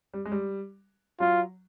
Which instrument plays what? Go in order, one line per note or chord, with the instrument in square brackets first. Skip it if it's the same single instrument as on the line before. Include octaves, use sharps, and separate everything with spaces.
[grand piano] G3
G#3
G3
[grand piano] F#3 [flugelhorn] F4